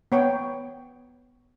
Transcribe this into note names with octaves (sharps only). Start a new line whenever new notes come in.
B3 C#5 G5